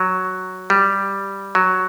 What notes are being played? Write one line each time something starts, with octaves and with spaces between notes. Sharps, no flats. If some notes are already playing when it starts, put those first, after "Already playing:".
Already playing: F#3
G3
F#3